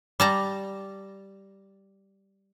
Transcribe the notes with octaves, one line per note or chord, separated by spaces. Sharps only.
G3 A5 A#5